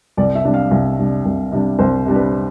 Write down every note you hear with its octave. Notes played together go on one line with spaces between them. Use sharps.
C2 D5
E5
C3 G3 D4
F5
C2
C3 G3 D4
C2
C3 G3 D4
C2 C5
C3 G3 D4
B4